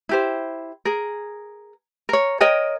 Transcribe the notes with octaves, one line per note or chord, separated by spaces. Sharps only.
E4 G4 C5
G#4 A#4
A#4 C#5
A#4 C#5 D#5 G5